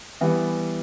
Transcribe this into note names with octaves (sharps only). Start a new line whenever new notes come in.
E3 G3 B3